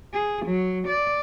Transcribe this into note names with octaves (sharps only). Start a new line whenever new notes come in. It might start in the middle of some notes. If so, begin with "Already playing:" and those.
G#4
F#3
D5